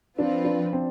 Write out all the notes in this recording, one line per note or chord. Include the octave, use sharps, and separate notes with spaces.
F3 C4 D4 F4 B4
D4
C4